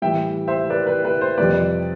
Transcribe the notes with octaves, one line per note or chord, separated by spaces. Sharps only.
A2 E3 G3 E5 G5
C5 E5
B4 D5
B4
B4
C5
F2 C3 G3 C4 B4 D5